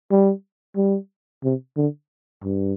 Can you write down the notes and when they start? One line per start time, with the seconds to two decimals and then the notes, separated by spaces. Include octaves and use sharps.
0.11 G3
0.76 G3
1.44 C3
1.77 D3
2.44 G2